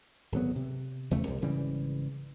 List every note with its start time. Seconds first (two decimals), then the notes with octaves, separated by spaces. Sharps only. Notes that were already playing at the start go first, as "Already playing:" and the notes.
0.32 G#1 D2 F#3 B3
0.56 C3
1.10 D1 E2 C#3 A3
1.27 C2 C3
1.42 G#1 C#3 E3 G3